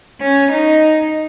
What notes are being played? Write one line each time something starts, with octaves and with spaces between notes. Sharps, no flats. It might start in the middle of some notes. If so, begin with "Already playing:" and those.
C#4
D#4